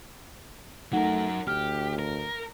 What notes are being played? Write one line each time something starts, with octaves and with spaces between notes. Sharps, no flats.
F#3 A3 D#4 A#4 F#5
D2 G4 F6
A#4